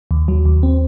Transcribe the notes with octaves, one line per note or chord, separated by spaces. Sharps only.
D#2
F#3
D#2
C4